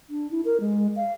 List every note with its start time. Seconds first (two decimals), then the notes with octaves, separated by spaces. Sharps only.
0.10 D4
0.31 E4
0.45 A#4
0.60 G#3
0.96 F5